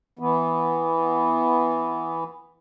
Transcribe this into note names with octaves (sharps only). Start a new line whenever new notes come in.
E3 B3